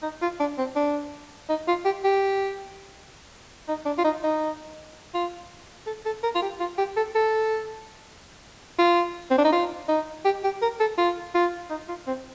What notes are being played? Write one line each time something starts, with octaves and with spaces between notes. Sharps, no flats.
D#4
F4
D4
C4
D4
D#4
F4
G4
G4
D#4
D4
F4
D#4
D#4
F4
A4
A4
A#4
F4
G4
F4
G4
A4
A4
F4
C4
D4
D#4
F4
D#4
G4
G4
A#4
A4
F4
F4
D#4
F4
C4